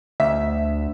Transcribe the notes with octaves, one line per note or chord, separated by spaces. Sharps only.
D2 E5